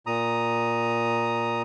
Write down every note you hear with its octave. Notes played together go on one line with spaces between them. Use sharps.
A#2 A#5 D#6